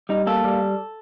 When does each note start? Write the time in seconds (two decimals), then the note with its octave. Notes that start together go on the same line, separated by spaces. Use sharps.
0.09 G3 D#4
0.27 A#3 A4
0.44 G3